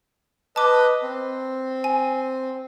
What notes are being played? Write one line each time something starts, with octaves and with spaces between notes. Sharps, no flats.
B4 D#5 A5 D6
C4
G#5